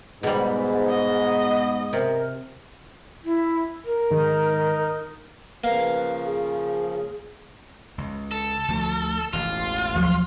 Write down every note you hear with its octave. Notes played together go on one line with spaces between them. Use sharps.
G#2 B2 G3 B3
D#5
C3 A#4
E4
A#4
G#2 D#3 D#4
C#3 F3 A#3 B4 F5
G#4
C#2
A4
D2 F3 A3
E1 A1 E3 F4
D#2 F3 F#3